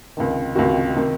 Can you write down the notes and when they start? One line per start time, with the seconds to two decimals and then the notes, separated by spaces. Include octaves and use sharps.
0.17 C#2 C3 D#3
0.55 C#2 C3 D#3 F#4
0.97 C3 D#3